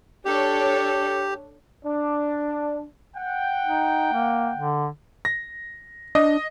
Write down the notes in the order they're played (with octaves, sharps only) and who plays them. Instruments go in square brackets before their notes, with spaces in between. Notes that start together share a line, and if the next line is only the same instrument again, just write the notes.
[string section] D4 A4 C#5 [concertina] G4
[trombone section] D4
[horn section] F#5 G5
[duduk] D#4
A#3
D3
[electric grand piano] A#6
[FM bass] D4 [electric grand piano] D#5